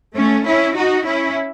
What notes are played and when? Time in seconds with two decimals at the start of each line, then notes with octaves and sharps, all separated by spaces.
0.15 A3 C#4
0.45 C#4 E4
0.75 D#4 F#4
1.05 C#4 E4